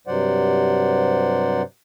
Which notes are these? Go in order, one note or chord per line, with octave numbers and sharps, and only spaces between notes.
G2 C3 F#3 C5 D5 F#5